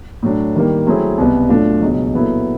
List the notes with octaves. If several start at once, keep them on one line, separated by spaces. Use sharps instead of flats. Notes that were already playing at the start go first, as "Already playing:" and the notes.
A2 F#3 A3 D4
D#3 G3 A#3
F#3 A3 C4 E4 G#4
C2 B2 G3 B3
A2 F#3 A3 D4 F4
C#2 B2 F#3
A#2 F#3 B3 E4 A4